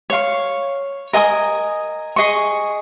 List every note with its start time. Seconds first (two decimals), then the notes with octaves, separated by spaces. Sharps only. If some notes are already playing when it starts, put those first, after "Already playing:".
0.10 C#5 F5 C#6
1.13 A#4 D#5 G#5 D#6
2.16 G#4 D#5 C#6